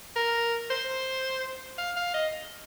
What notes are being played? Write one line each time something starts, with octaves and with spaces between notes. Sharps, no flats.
A#4
C5
F5
F5
D#5